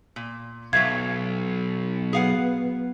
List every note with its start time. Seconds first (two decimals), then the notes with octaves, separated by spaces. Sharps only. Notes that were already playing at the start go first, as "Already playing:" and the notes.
0.16 A#2
0.73 B1 F#3 E5 F5 G#6
2.13 F#3 B3 G#4 F5 F#5